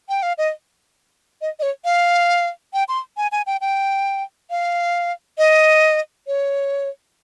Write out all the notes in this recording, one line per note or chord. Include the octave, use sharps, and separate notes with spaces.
G5
F5
D#5
D#5
D#5
C#5
F5
G5
C6
G#5
G#5
G5
G5
F5
D#5
C#5